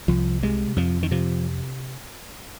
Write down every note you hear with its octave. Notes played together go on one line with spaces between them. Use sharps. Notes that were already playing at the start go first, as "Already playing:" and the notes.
C2 F3
C3 G#3
F2 F3
D#3
C3 F3